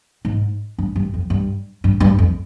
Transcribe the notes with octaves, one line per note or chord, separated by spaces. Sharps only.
G#2
G2
G2
F2
G2
G2
G2
F2